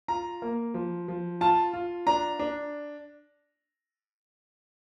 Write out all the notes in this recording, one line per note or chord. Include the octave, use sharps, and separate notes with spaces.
F4 A#5
A#3
F3
F3
F4 A5
F4
D4 A#5
D4